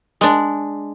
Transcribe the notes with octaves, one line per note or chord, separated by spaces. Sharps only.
G#3 D4